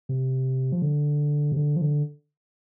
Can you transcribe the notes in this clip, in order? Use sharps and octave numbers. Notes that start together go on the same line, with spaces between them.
C3
F3
D3
C3
D3
F3
D3